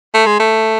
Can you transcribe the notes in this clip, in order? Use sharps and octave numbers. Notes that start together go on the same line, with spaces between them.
A3
G#3
A3